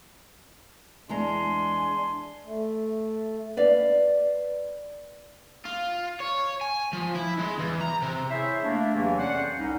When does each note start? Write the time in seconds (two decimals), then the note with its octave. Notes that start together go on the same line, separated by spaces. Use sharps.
1.09 E2 G#3 D4 G#5 A#5 C6
2.46 A3
3.57 B4 D5 F5
5.66 F4
6.20 C#5
6.61 G#5
6.93 F3
7.15 E4
7.38 G#3
7.59 E2
7.81 A#5
8.02 C3
8.30 E4 G#4 C5 C#5 E5
8.63 A3 A#3 D4
8.95 E2 C3 E3 F#3 A#3
9.18 F2 C#4 C5 D5 F#5
9.58 C2 G#2 G3 C#4 D#4